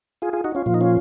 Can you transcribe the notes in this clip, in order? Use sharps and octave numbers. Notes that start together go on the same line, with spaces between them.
F4 G#4
F4 G#4
D#4 F#4
C#4 F4
A#2 F3 F4
D#4
C#4 F4